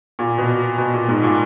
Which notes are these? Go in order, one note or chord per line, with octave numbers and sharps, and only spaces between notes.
A#2
B2
B2
A#2
G#2
A#2